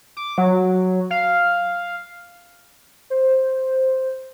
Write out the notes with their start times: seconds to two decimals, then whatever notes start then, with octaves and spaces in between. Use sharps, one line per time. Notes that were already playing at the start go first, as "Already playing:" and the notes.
0.17 D6
0.38 F#3
1.11 F5
3.10 C5